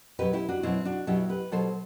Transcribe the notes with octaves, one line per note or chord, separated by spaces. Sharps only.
B2 F#3 G4 B4
E4 G4
D4 F#4
B2 F#3 C4 E4
D4 F#4
B2 F#3 E4 G4
G4 B4
B2 F#3 A4 C5